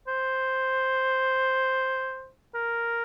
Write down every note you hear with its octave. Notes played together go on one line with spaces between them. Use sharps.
C5
A#4